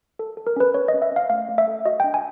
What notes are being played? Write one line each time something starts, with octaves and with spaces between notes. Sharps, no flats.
A4
A4
A#4
C#4 B4
C#4 C#5
D#5
C#4
E5
C#4 F5
A3 F5
A3
E5
A4
F#4 D#5
D4 G5
G#5